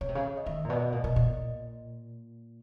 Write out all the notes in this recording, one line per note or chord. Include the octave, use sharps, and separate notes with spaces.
C#3 C#5
C3
C#3
D#5
D#3 E5
D#5
A#2
B2 D5
A#2 D#5
B2
A#2